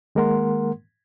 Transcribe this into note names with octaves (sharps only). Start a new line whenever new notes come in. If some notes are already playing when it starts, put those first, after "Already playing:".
D#3 G#3 A#3 A#4 F#5 C6